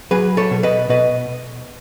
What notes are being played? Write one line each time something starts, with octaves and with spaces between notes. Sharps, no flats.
F#3 G#4 B4
A4 C#5
B2
B4 D#5
B2 B4 D#5